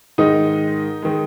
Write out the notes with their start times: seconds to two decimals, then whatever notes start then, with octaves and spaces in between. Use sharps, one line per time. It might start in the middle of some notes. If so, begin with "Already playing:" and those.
0.18 G#2 D#3 G#3 D#4 D#5
1.02 D#3 G#3